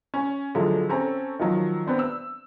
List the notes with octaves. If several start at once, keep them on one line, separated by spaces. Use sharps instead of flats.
C#4
A2 D3 F3 F#3 G#3 F4
C4 C#4 A4 A#5
D#3 F3 F#3
B3 C4 D4
E6